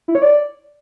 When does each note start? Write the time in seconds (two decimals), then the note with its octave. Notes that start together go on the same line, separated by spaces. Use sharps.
0.08 E4
0.15 C#5
0.22 D5